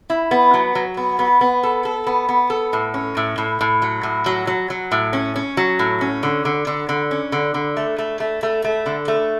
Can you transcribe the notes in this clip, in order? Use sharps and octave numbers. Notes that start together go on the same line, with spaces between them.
E4
B3
F#3
F#3
B3
B3
B3
A4
A4
B3
B3
A4
A2
C#4
A2
A2
A2
F#3
A2
F#3
F#3
F#3
A2
C#4
C#4
F#3
A2
C#4
D3
D3
D3
D3
C#4
D3
D3
A3
A3
A3
A3
A3
D3
A3